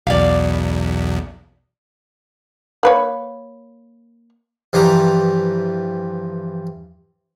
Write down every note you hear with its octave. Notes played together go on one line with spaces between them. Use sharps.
B1 E2 D5 F5
A#3 B4 C#5
G2 E3 F3 G4 A#5